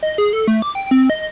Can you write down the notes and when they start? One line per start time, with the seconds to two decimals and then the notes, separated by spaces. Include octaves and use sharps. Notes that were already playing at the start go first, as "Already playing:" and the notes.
0.03 D#5
0.18 G#4
0.33 A4
0.48 A3
0.62 D6
0.75 G5
0.91 C4
1.10 D#5